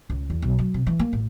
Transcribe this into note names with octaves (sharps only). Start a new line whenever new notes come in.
C#2
E2
B1
F#3
C3
E3
A#3
A1